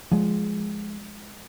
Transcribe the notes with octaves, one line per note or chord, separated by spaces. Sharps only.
F3 G#3